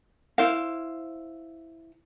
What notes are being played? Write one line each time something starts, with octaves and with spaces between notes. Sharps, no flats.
E4 C5 F5